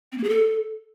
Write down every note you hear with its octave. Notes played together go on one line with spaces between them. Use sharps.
C4
A#3
G#4
A4